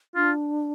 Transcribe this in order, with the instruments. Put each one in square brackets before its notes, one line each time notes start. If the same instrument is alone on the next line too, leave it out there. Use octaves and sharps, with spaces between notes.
[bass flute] D4 [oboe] F4